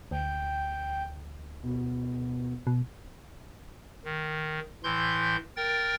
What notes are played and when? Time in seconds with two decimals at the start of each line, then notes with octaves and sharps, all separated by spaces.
0.11 D2 G5
1.63 B2
2.67 B2
4.05 D#3
4.84 A2 E3 C6 G6
5.57 A#4 G5 A6